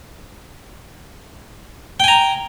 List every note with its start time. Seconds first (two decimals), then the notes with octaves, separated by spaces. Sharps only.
2.00 G5
2.04 G#5
2.08 A#5